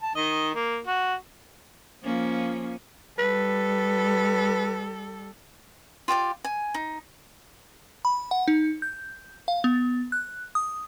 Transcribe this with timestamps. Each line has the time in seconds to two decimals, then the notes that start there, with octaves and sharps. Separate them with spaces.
0.02 A5
0.15 D#3 D#5
0.54 A#3
0.87 F#4
2.03 F3 A#3 C#4
3.19 G3 A4 B4
6.08 F4 G4 D5 D6
6.44 G#5
6.74 D#4
8.05 B5
8.31 F#5
8.48 D#4
8.82 G6
9.48 F5
9.64 B3
10.12 F#6
10.55 D#6